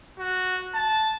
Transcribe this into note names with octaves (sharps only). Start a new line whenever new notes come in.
F#4
A5